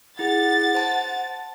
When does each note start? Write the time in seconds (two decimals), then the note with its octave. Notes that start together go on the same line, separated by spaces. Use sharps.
0.19 E4 G#4 F#5 A6
0.75 C5 A5